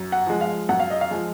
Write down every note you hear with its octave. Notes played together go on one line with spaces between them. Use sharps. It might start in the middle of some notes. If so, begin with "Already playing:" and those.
Already playing: F#2
F#5
F3 G#3
F5
F#2 F#5
F5
D#5
F5
F3 G#3